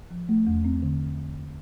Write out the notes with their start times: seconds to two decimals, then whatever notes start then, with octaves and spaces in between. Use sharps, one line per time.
0.10 F3
0.29 A3
0.47 E2
0.65 C4
0.83 D3